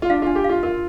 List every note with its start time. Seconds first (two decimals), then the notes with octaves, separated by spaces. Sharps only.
0.02 F4
0.10 D4 F5
0.22 D4 F4
0.35 G4
0.44 F4 F5
0.63 F4 A#4